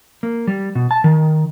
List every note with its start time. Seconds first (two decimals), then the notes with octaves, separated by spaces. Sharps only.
0.23 A#3
0.47 G3
0.75 B2
0.91 A5
1.04 D#3